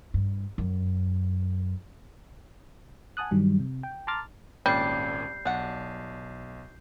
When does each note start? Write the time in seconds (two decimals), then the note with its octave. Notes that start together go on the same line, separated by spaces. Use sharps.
0.14 G2
0.58 F#2
3.17 F#5 G#5 A5 D#6 F#6
3.31 G2 D#3 F#3 G3
3.60 C3
3.83 G5
4.07 A5 A#5 C6 D6 F6 A6
4.66 G#1 A#2 G3 C#4 D4 G6 C7
5.45 B1 D4 F#5